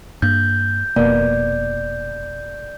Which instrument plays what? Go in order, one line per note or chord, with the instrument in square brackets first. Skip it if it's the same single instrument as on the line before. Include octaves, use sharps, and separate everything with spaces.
[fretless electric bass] G2 A#3 [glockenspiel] G6
[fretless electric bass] F1 B2 [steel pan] A#3 [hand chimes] D5